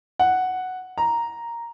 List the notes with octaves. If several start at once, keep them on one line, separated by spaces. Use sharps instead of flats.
F#5
A#5